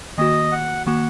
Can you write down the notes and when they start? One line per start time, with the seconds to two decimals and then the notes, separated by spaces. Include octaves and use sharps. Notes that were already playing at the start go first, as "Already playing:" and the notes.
0.18 D#3 A#3 F#4 D#5
0.52 F#5
0.87 D#3 A#3 F#4 F#5